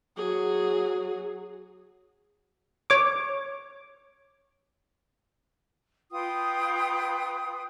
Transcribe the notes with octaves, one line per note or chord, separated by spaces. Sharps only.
F#3 G#4
C#5 D6
F4 B4 G5 D#6